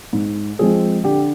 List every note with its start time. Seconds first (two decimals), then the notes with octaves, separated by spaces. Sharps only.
0.13 G#2
0.59 F3 G#3 C4 G#4
1.04 D3 G4